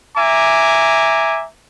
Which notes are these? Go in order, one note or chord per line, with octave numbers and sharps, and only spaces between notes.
E5 G#5 A#5 D6